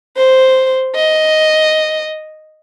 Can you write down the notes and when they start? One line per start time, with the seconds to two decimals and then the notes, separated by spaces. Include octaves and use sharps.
0.16 C5
0.95 D#5